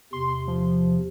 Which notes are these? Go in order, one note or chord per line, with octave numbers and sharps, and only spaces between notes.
E2 C3 C6
F3